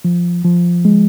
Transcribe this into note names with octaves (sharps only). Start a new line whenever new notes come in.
F3
F3
G#3